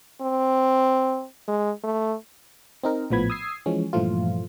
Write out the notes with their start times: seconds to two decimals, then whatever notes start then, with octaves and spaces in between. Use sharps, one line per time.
0.21 C4
1.48 G#3
1.83 A3
2.84 C4 D#4 A#4
3.10 A#1 A2 F3 B3 B5 G#6
3.30 D#6 E6 G#6 C7
3.66 E3 F3 G#3 C#4
3.93 G2 A#2 E3 F3 A3 F4